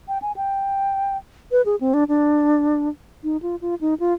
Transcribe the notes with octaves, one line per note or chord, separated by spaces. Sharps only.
G5
G#5
G5
B4
G#4
C4
D4
D4
D#4
F4
F4
D#4
F4